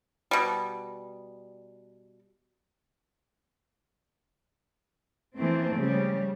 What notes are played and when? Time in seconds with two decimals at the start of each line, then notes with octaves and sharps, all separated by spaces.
0.31 B2 G3
5.37 E3 F3 A3 A#3 C4
5.75 C#3 G3